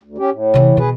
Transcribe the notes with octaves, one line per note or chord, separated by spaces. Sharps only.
D2
C#4 G4
A2
C3 E3
B2 G#4 B4